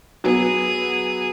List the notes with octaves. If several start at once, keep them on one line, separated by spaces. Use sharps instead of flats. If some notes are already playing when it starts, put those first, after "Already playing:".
F#3 B3 G#4